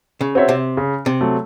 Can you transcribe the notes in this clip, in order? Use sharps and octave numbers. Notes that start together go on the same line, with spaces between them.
C#3
C4 F#4 C#5 E5
C3
C#3
C3
F#3 A3